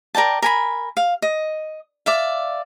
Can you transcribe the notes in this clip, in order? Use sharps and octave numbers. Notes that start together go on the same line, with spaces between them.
A#4 D5 G5 A5
A#4 G#5 B5
F5
D#5
D5 E5 F5